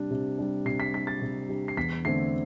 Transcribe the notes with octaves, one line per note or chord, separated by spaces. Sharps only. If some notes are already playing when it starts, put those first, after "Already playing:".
Already playing: C3 G3 D4
C3
G3 D4
C3 C7
B6
G3 D4 B6
A6
C3
G3 D4
C7
E2 B6
D3 A3 C4 C7